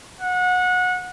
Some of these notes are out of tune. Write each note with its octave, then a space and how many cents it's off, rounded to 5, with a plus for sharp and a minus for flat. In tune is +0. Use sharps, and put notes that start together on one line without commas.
F#5 -25